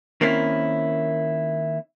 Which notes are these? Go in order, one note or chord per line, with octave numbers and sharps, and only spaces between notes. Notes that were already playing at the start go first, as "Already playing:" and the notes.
D#3 A#3 C4 C#4 E4